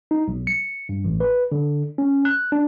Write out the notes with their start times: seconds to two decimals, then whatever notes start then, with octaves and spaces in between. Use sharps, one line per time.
0.11 D#4
0.28 B1
0.47 C#7
0.89 G2
1.05 A1
1.20 B4
1.52 D3
1.98 C#4
2.25 F#6
2.52 D4